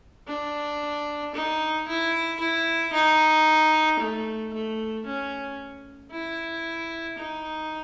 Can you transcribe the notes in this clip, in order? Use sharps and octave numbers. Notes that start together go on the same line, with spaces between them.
D4
D#4
E4
E4
D#4
A3
A3
C#4
E4
D#4